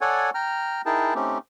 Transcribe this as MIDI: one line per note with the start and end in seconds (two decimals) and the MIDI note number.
0.01 0.30 69
0.01 0.30 73
0.01 0.30 74
0.01 0.30 78
0.01 0.30 80
0.34 0.82 79
0.34 0.82 82
0.34 0.82 89
0.86 1.14 63
0.86 1.14 64
0.86 1.14 68
0.86 1.14 70
0.86 1.14 79
0.86 1.14 81
1.15 1.38 57
1.15 1.38 60
1.15 1.38 61
1.15 1.38 63
1.15 1.38 67